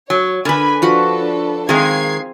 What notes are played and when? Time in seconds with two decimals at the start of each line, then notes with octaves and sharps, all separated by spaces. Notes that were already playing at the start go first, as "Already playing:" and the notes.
0.10 F#3 C#5
0.45 D3 A#4 B4 G#5 B5
0.82 F3 D4 F#4 A4 B4 B5
1.69 D#3 G#3 C4 G#4 A#4 F5 G#6 C7